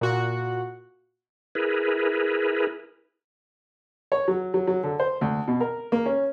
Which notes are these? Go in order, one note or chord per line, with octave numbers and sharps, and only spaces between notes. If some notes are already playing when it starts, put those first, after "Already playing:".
A#2 F#4 F#5
E4 G#4 A#4 B4
C#5
F#3
F#3
F#3
D3
C5
D2
B2
A#4
A#3
C#4